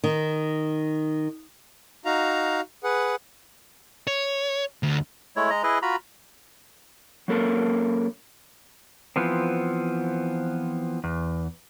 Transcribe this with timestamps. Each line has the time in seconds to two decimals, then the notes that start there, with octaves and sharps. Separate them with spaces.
0.04 D#3
2.05 D#4 F#4 F5 A#5
2.84 G#4 B4 F#5
4.07 C#5
4.83 D2
5.36 G#3 A3 E4 C#5
5.50 G#3 D#5 A#5
5.63 E4 G#4 B4 D#5
5.82 F4 F#4 A#5 B5
7.28 F#3 A#3 C#4 A4 A#4
9.16 E3 F3 B3 C4
11.04 E2